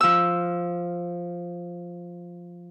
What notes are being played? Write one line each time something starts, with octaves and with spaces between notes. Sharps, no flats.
F3 E6